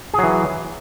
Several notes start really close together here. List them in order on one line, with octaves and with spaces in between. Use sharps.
G#4 F#3 E3